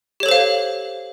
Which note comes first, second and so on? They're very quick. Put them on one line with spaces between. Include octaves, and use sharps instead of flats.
G4 C#5 A4 C5 F5